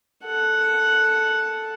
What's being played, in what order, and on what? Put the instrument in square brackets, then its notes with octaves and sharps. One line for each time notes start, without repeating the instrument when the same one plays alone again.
[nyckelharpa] A4 F#5